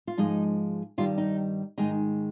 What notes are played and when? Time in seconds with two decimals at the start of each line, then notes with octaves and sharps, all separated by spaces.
0.07 F4
0.18 G#2 F3 G#3 D#4
0.98 G2 D#3 G3 F4
1.18 D#4
1.78 G#2 D#3 G#3 D#4